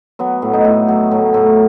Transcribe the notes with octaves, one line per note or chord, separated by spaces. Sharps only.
F#3 B3
A2
D#4
A2
F#3
A2
A2